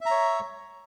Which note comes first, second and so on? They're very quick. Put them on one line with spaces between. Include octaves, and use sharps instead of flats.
E5 A#5 C#5